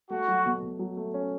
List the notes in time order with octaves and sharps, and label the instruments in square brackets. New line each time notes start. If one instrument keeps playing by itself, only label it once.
[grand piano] A3 [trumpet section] F#4
[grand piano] F#3
B2
B2
F#3
A3
C#4